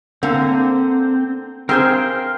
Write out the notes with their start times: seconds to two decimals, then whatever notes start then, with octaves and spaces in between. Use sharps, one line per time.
0.23 D3 A#3 C4 F#5
1.69 C4 G#4 A#4 C5 F5 G5